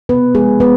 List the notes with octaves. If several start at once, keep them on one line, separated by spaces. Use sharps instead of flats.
C3 B3 B4
F3 G#3 G#4
G#3 B3 B4